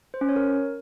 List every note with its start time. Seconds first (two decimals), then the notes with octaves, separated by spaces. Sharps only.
0.14 C5
0.21 C#4
0.29 C#5
0.36 A#4